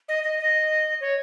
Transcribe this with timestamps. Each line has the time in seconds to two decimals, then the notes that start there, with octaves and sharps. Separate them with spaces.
0.09 D#5
0.24 D#5
0.39 D#5
1.01 C#5